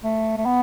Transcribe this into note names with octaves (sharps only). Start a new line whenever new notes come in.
A3
A3
B3